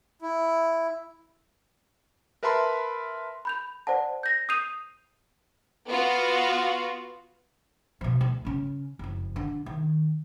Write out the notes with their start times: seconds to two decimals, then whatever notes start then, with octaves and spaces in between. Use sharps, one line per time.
0.22 E4
2.43 A#4 B4 E5 A5 B5 C6
3.45 B5 G6 F7
3.87 C5 D5 F#5 A5
4.23 G6 A#6
4.49 D#6 G6 C7 D#7 F7
5.88 B3 F4 F#4
8.01 B2 F3
8.21 D2
8.45 C#3 C#4
8.99 F#1 F2
9.36 D3
9.66 D#3